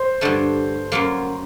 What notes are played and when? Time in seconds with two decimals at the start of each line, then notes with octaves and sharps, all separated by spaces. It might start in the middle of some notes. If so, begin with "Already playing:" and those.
Already playing: C5
0.21 G2 D3 A3
0.92 F#2 F#3 A#3